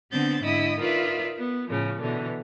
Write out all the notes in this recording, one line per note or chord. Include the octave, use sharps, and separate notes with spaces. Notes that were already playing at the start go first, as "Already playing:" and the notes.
D3 B3 C4 G6 A6
G#2 D3 E4 D#5 D#6 E6
D#4 F4 A#4 B4 D5 E5
B3
A2 C#3 F3
B2 D3 E3